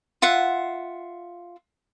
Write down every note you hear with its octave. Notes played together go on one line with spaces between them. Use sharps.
F4 E5 F#5